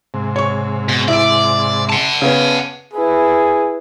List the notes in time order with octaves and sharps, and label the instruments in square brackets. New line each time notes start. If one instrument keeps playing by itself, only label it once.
[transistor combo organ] G#2 C3
[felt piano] C#5 C#6
[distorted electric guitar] B2
[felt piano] E4 E6 D7 [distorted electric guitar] D5
[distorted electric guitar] F#5 A5
[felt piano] C#3 B3 C#4
[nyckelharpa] E4 B4 [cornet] G#4